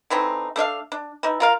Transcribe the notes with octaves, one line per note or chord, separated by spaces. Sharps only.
D3 E3 C4 D#4
A3 D4 E5 F5
D4
E3 D#4
F4 A#4 F5